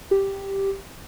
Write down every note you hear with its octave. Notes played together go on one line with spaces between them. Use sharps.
G4